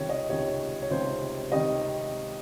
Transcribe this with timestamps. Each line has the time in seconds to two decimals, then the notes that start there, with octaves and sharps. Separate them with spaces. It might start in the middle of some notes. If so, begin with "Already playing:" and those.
Already playing: C#2 C3 D#3 G3 C#5
0.09 D#5
0.29 C#2 C3 D#3 G3 C#5
0.82 C#5
0.90 C#2 C3 D#3 G3 C5
1.52 C3 D#3 G3 D#5